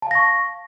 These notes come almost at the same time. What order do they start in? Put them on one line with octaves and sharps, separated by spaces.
A5 F5 A#6 C#6